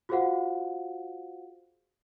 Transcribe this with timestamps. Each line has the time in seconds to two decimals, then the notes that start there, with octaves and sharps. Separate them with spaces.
0.09 F4 F#4 G#4 C5 F5 F#5